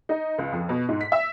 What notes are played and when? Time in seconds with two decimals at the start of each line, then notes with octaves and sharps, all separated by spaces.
0.09 D#4
0.38 C#2
0.52 F2
0.69 B2
0.89 G#2
1.01 B6
1.12 E5